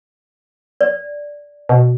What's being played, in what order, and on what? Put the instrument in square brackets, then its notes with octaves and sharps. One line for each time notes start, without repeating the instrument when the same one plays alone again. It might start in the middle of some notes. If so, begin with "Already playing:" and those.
[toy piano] D5
[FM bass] B2